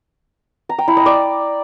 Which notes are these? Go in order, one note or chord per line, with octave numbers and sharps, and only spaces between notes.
A#5
G5
E4
D#5
D5